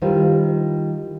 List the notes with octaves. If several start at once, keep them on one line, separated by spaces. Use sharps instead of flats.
D#3 G3 E4 F4 C5